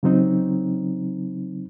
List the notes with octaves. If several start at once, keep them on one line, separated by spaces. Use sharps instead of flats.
C#3 F#3 C4 D#4